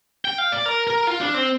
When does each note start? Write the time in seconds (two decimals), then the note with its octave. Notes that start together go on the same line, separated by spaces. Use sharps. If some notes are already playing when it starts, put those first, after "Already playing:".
0.25 G5
0.38 F5
0.52 D5
0.66 A#4
0.87 A#4
1.07 F4
1.21 D4
1.34 C4